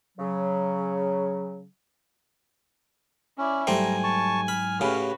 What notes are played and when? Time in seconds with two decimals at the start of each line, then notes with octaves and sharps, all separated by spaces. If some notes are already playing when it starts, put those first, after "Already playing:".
0.18 C#3 F#3
3.38 C#4 E4 D5
3.67 G#2 F#3 G3 A3 C5 G5 G#5 A#5
4.04 A5 C#6
4.48 B5 F6
4.81 A2 C#3 F#4 G4 B4 G#5 B5